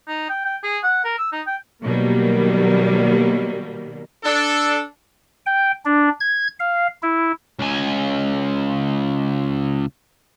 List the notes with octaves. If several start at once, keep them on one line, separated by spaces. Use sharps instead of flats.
D#4
G5
G5
G#4
F#5
A#4
E6
D#4
G5
B2 D#3 F#3 G3 A#3
D4 A4
G5
D4
G#6
F5
E4
C#2 G#5